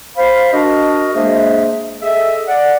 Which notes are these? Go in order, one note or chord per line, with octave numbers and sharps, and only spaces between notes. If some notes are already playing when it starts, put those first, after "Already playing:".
C5 F5 B5
D4 F#4 A#4 D#5
G#3 A#3 D4 G#4 C5 E5
G#4 A4 D#5 E5
D5 F#5